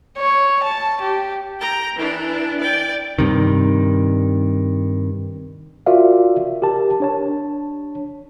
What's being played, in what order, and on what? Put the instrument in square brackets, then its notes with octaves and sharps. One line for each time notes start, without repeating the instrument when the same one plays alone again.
[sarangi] C#5
A5
G4
[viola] G5 A#5
E3 D4
D5 G5
[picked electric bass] G2 C3 D#3
[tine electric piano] F4 F#4 A#4 D5 E5 F5
G4 A#4 A5
D4 C#5 A5